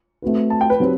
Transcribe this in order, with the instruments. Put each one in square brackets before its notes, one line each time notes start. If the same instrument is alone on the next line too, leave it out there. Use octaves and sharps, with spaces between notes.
[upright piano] A3 C4 F#4 B4
[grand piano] A5
G5
B4
[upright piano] F#3 C4 G4